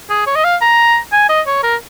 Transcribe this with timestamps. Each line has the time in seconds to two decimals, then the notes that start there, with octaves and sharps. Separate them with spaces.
0.10 G#4
0.27 C#5
0.36 D#5
0.45 F5
0.62 A#5
1.13 G#5
1.29 D#5
1.47 C#5
1.63 A#4